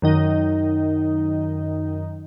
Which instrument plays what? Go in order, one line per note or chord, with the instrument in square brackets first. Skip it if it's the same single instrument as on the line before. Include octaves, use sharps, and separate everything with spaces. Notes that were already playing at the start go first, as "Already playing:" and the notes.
[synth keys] F#2 D#3 D#4